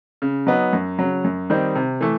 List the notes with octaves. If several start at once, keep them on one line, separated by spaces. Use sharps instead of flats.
C#3
F#3 B3 D#4
F#2
C#3 F#3
F#2
D#3 G3 C4 D#4
C3
E3 A3